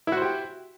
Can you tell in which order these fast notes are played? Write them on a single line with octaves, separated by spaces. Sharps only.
E4 F#4 C5 G4